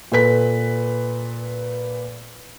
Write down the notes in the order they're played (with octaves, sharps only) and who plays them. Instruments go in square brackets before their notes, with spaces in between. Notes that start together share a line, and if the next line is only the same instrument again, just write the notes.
[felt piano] A#2 A4 B4 B6